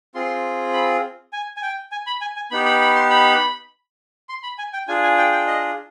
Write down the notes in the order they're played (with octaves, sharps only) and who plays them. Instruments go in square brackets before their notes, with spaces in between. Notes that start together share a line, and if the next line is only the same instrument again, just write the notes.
[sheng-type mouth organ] C4 F4 G#4 C6
B5
G#5
G#5
G5
G#5
B5
G#5
G#5
B3 D#4 G4 B5
B5
B5
C6
B5
C6
B5
G#5
G5
D4 F4 G#4 G#5
G#5
G5
G5
D#5